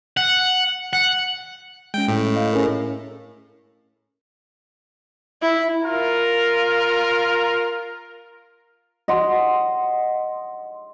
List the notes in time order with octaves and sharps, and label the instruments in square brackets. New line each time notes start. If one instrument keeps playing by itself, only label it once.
[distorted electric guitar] F#5
F#5
[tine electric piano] G#3 C#4 [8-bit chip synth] G5
[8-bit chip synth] A2
[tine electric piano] D#5 F5
C#4 G#4 A#4
[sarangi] E4
[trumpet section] F4 A#4
[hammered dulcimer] D#5 F#5 C6